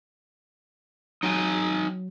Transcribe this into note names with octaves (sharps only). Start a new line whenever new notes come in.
F#3 D#4 G5 G#5